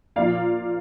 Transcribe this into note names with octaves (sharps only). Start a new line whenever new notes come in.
A#2 F3 A#3 D5 F5